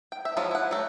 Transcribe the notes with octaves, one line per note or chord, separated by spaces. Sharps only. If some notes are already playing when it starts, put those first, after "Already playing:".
G5
E5
F3 F#3 G#3 F4 G#4
E4 F#5
F#3 A3